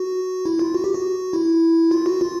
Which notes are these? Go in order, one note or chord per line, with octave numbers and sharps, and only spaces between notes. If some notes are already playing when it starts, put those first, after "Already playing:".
Already playing: F#4
E4
F4
F#4
G4
F#4
E4
F4
F#4
F4